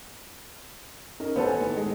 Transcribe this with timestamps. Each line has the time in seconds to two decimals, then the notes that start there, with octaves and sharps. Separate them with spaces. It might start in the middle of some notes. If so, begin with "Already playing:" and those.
1.20 C#4 D#4 A#4
1.36 A1 B3 A4 C5 C#5
1.48 G#5
1.60 E2 A2 D#3
1.77 G#3